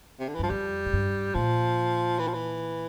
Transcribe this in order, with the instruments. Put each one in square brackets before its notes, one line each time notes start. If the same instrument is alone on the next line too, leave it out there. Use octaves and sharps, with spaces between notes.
[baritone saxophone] C3
D3
E3
[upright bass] G2 [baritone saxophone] F3
[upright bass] F2 [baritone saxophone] G3
[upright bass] A2
G2
[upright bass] A#2 [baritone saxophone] F3
[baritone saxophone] E3
F3
E3